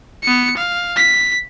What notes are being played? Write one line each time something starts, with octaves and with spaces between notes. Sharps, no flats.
B3 C#7
F5
B6